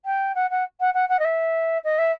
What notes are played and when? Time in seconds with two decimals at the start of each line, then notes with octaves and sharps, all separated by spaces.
0.05 G5
0.35 F#5
0.50 F#5
0.80 F#5
0.94 F#5
1.08 F#5
1.19 D#5
1.24 E5
1.84 D#5
1.98 E5